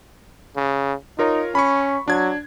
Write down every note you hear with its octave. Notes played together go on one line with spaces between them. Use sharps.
C#3
D#4 F4 A#4 C#5
C#4 B5 C#6
F#3 D4 G#6